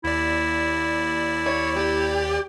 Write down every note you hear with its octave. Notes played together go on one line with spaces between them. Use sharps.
D#2 E4 D5
C#5
G4